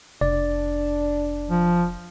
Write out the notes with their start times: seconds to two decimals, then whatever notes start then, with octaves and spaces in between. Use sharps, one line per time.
0.21 F1 D4 D5
1.50 F3